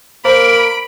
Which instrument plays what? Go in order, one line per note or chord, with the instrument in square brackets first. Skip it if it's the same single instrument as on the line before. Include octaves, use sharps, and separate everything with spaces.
[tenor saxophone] A#3 [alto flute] A#4 [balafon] C5 [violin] B5 D7